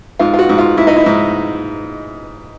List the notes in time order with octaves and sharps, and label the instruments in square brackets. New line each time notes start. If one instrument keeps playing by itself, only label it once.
[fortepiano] G#2 F4
F4
F#4
G#2
F4
G#2 E4
D#4
E4
G#2